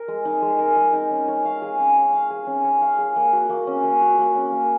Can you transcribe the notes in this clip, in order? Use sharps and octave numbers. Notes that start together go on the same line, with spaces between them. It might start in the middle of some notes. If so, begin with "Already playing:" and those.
Already playing: A#4
G#3
D#4
G#3
A#4
G#3
D#4
C#4
C#5
F5
G#4
C#4
C#5
F5
G#4
C#4
C#5
F5
G#4
A#3
F#4
A#3
C#4
A#3
F#4
A#3
C#4
A#3